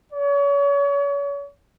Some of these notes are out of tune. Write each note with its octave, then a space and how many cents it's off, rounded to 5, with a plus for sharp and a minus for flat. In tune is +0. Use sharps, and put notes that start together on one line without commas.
C#5 +35